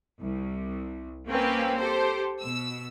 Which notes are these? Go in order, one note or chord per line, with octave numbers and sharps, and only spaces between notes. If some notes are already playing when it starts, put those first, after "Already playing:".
C2
A#3 C4 C#4 G4 B4
G4 A4 C5
B2 E6